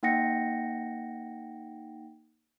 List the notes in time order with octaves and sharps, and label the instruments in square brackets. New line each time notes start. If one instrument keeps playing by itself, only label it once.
[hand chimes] A#3 D#4 F#5 G5 A#6 C#7